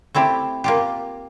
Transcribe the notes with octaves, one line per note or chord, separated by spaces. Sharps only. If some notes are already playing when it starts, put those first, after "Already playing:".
A3 C4 E4 G4
A#3 F4 G4